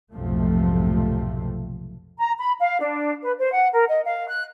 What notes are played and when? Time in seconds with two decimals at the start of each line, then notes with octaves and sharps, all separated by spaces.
0.13 B1 F2 G#2 C3 F3 A3
2.18 A#5
2.39 B5
2.60 F5
2.81 D4
3.24 B4
3.37 C5
3.54 F#5
3.73 A#4
3.88 D#5
4.05 F5
4.28 F#6